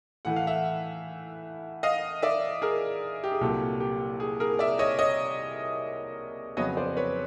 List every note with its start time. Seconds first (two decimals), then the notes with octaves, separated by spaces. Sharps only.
0.25 A2 E3 A3 F#5
0.36 F5
0.47 E5 F#5
1.83 D#5 F5
2.22 D5 E5
2.62 G#4 A#4
3.24 G4
3.32 G#4
3.41 C2 A#2 F#3 G4 A4
3.80 G4
4.20 G#4
4.40 G#4 A#4
4.59 D5 E5
4.79 C#5 D#5
4.99 C#5 D#5
6.57 F2 C#3 F#3 B3 C#5 D#5
6.77 C5 D5
6.97 B4 C#5